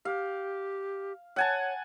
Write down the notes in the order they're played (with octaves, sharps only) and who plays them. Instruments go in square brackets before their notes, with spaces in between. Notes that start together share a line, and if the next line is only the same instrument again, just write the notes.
[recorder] G4 [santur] F5
[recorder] C#5 [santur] F#5 G#5 A5